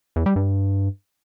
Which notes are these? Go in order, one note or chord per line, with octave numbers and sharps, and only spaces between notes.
E2
G3
G2